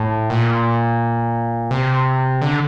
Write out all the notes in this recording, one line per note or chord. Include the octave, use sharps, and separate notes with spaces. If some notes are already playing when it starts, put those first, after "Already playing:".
Already playing: A2
A#2
C3
D3